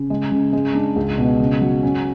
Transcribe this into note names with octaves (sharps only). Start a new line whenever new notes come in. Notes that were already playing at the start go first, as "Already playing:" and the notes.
Already playing: C#3
G#3
C#3
G#3
D4
C#2
B2
C#3
F#3
C#4